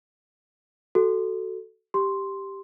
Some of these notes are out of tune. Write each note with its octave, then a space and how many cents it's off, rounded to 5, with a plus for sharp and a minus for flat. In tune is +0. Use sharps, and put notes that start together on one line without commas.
F#4 +15 A4 +0
G4 +0 C6 +0